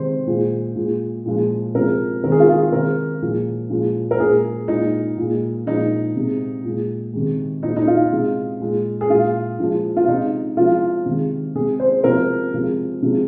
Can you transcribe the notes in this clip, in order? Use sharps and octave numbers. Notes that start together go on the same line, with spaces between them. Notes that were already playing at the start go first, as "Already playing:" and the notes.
Already playing: C3 D#3 G#3 C5
A#2 G#3
A#2 G#3
A#2 F3 G#3
C3 F3 G#3 A#4
C3 D#3 G#3 A#4
G#4
F4
G#4
C3 D#3 G#3 A#4
A#2 F3 G#3
A#2 F3 G#3
A#4
A#2 G#3 G#4
A#2 G#3 D#4
A#2 G#3
A#2 F3 G#3 D#4
C3 G#3
A#2 G#3
C3 D#3 G#3
A#2 G#3 D#4
D#4
F4
C3 G#3
A#2 G#3
G#4
A#2 G#3 F4
A#2 F3 G#3
F4
C3 G#3 D#4
C3 F3 G#3 F4
C3 D#3 G#3
C3 G#3 G#4
C5
C3 F3 G#3 A#4
C3 F3 G#3
C3 F3 G#3